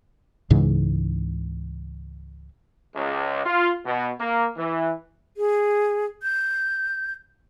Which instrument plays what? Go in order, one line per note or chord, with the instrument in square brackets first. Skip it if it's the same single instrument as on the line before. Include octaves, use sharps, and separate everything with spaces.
[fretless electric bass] C#2 G#2 C#3 E3
[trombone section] C#2
F4
B2
A#3
E3
[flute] G#4
G6